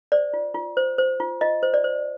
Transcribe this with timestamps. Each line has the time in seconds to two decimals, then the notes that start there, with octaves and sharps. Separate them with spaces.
0.12 C5 D5
0.33 F4
0.55 F4
0.77 C5
0.98 C5
1.20 F4
1.41 F4 D#5
1.63 C5
1.74 D5
1.84 C5